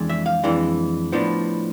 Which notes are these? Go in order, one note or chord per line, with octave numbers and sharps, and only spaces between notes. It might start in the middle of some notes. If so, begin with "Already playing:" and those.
Already playing: F2 E3 G#3 D4
E5
F5
F2 E3 G#3 D4
A2 F3 B3 D4